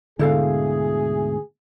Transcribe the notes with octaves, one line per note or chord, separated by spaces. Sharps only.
D2 G#2 B2 D3 E4 G#4 A4 F5